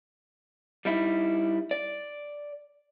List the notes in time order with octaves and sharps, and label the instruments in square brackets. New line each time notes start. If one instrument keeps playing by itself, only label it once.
[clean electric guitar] G3 D#4 E4
D5